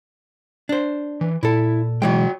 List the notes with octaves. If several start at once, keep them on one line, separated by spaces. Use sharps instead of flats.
D4 C5
E3
A#2 E4 A4
B1 E3 G#3 F#4 C#5 G5